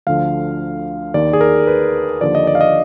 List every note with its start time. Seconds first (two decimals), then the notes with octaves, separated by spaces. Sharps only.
0.07 D2 D3 F3 F5
1.14 D#2 D#3 D5
1.33 G#4
1.41 A#4
1.67 B4
2.21 D#2 D3 F3 D5
2.35 D#5
2.47 D5
2.55 F5
2.61 D#5